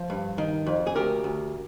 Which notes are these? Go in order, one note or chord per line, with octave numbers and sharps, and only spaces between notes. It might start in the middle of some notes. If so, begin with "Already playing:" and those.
Already playing: F3
G2
D#3
F2
G#4
D2 G4 A#4
D2